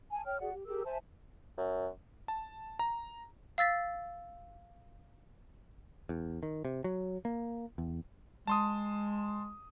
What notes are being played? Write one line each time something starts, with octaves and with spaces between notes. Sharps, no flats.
G#5 A5
C#5 G5 F6
F#4 G#4 D5 F#5
G4
G4 G#4 A#4 E6
C5 E5 G#5 A5
F#2
A5
A#5
F5 E6 A6 B6
E2
D#3
C3
F#3
A#3
E2
G#3 A5 C6 D#6